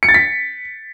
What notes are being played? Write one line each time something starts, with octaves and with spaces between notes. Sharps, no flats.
C#7
A6
B6